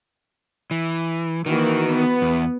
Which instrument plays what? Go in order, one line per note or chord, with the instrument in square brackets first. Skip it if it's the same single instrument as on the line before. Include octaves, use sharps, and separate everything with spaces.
[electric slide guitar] E3
[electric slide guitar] D#3 [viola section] E3 A#3 F#4
[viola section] B3
[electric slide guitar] E2